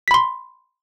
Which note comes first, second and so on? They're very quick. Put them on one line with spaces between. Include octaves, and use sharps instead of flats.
B6 B5 C6